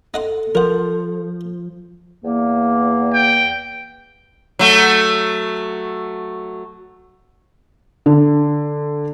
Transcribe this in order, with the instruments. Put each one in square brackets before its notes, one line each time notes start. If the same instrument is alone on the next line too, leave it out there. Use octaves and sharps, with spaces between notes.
[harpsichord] D#4 F#5 C6 [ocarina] A4
[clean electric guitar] F3 [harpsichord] A#4 F#5
[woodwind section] E2 A#3
[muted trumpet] G5
[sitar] F#3 A3
[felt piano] D3